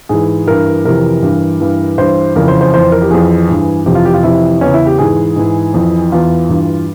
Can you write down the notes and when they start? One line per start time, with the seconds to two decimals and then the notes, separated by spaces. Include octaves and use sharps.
0.09 G#2 E3 G#4
0.47 G2 E3 A#4
0.84 F2 C3 E3 A#4
1.23 G2 E3
1.61 G2 E3
1.98 G2 E3 C5
2.36 F2 C#3 E3 A#4
2.48 C5
2.61 C5
2.74 F2 E3 C5
2.92 A#4
3.02 G4
3.10 F2 E3 G#4
3.49 G2 E3
3.86 F2 C3 E3 G4
3.95 F4
4.05 G4
4.14 F4
4.23 F2 C3 E3 E4
4.61 E2 C#3 E3 C#4
4.74 E4
4.87 G4
4.99 G#2 E3 G#4
5.36 G#2 E3
5.74 F2 E3
6.12 E2 E3 F4
6.49 G2 E3